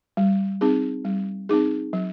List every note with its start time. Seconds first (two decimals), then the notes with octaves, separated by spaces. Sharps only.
0.17 G3
0.61 C4 D#4 G#4
1.05 G3
1.49 C4 D#4 G#4
1.93 F#3